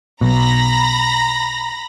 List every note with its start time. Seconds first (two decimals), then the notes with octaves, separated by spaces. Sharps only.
0.21 B1 B2 A#5 B5 A#6